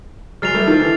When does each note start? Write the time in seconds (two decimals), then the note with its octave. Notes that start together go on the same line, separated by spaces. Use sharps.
0.42 F#3 G#3 F6 A6 C7 F7
0.54 G3 A3
0.67 D#3 F3
0.80 D3 E3